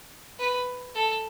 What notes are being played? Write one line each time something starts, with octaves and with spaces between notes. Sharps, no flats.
B4
A4